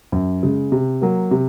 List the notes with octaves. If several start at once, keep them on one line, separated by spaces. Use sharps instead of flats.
F#2
C#3 G#3
C3
F#3 A#3
C3